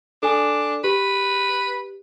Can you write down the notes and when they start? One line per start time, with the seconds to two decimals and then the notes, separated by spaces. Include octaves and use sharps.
0.23 D4 A4 G#5
0.84 G4 B4